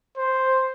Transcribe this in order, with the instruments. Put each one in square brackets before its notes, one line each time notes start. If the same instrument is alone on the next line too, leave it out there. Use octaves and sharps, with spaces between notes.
[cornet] C5